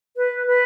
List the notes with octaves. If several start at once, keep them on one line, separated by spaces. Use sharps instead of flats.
B4
B4